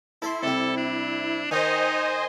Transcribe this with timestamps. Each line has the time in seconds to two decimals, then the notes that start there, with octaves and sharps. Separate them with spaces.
0.22 E4 A4 E5 C6
0.43 C3 G3 A4
0.78 D4
1.51 D#3 D#4 C5 D#5 G#5